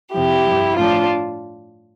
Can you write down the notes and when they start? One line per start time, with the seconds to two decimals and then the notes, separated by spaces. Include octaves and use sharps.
0.14 F2 C3 F3 E4 G4
0.46 G2 F3
0.77 A2 F3 D4 F4